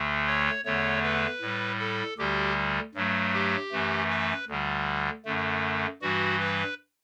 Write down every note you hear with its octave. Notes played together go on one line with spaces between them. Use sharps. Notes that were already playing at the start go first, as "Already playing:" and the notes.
Already playing: D2 D3 A3
C#5
E2 D3 A3 C#5
B4
A2 G3
A4
D2 D3 G3 G4
G2 F#3 A3
G4
F#2 E3 A3
B4
D2 D3 G3
F#2 D3 A3
G2 E3 G3 F#4
B4